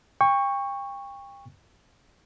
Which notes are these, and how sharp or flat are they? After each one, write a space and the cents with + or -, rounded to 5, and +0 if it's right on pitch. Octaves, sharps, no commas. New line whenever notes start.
G5 +35 C#6 +0